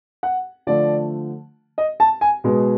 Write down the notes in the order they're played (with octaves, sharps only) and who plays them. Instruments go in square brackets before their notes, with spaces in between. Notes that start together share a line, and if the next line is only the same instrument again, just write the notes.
[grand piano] F#5
D3 F3 A3 D5
D#5
A5
G#5
B2 G#3 B3